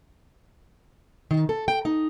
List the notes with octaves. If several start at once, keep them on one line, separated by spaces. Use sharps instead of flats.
D#3
A4
G5
D#4